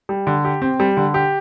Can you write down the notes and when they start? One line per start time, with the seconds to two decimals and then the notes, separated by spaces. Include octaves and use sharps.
0.09 G3
0.27 D3
0.45 G4
0.62 C4
0.80 G3
0.97 D3
1.14 G4